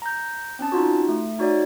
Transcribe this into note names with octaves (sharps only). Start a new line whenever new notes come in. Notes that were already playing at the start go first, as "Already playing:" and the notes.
A#5 G6
C4 C#4 A5
D#4 F4 F#4
A3
D#4 F#4 C#5 D5